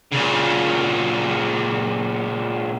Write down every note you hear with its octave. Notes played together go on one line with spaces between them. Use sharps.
A#2 C#3